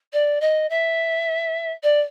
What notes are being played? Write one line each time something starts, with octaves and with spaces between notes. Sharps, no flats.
D5
D#5
E5
D5